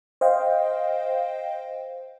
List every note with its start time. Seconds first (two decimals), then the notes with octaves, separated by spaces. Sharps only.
0.21 C5 D#5 F5 G5